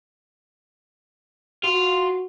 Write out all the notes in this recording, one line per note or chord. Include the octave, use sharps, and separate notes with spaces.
F4 F#4